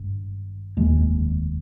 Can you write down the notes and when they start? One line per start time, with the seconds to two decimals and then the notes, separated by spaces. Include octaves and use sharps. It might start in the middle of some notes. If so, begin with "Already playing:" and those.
Already playing: G#1 G2
0.77 F1 D#2 D#3 G#3